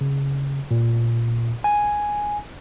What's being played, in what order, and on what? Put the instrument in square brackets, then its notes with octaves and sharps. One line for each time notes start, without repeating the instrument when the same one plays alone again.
[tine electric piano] C#3
A#2
G#5